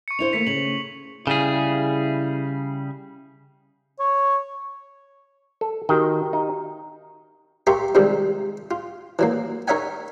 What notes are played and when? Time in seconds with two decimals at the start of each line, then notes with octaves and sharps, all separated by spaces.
0.08 C#6 C#7
0.19 D4 E4 C5 F7
0.33 D#3 A3 A#3 B6 C#7
0.47 C#3 F#7
1.27 C#3 G3 E4 G#4
3.99 C#5
5.61 A4
5.89 D#3 F#4 G4 G5 A#5
6.33 D#4
7.67 G4 A#4 E5 F5 C6 C#6
7.95 C3 D#3 F3 G3 G#3
8.71 F4
9.19 E3 F#3 A#3
9.68 D#4 A#4 C#5 E5 F#5 G#5